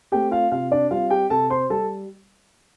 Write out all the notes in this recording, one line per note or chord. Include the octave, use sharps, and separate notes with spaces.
A3 C4 G4 G5
F4 F5
C3 F4 F5
D4 D5
G3 C4 F4 F5
G4 G5
C3 A4 A5
C5 C6
G3 A4 A5